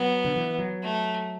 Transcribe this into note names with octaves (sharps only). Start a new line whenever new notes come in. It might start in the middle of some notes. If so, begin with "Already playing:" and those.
Already playing: F#3 B3
D3
E3
F#3
A3